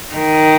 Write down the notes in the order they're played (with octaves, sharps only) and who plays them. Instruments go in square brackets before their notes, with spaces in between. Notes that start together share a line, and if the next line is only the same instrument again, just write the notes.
[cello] D#3